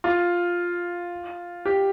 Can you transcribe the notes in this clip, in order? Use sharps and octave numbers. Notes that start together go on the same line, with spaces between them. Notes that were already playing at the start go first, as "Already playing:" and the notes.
F4
G4